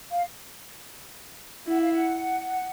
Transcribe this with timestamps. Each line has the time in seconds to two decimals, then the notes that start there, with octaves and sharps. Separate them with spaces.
0.11 F5
1.67 E4 F#5
1.81 F5
1.93 F#5